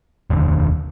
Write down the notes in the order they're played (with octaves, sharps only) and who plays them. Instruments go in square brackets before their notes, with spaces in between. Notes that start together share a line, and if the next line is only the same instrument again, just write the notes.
[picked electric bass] F1 D#2 D3